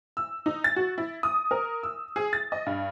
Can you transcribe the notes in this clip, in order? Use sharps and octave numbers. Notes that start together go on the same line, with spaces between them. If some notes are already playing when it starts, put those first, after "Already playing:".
E6
D#4
A6
F#4
E4
D#6
A#4
E6
G#4
A6
D#5
G2